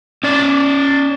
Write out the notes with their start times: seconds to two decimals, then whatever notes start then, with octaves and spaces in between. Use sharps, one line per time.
0.23 C#4 D5